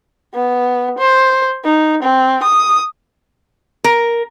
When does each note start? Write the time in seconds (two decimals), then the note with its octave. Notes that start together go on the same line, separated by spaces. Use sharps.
0.35 B3
0.99 C5
1.65 D#4
2.03 C4
2.44 D#6
3.84 A#4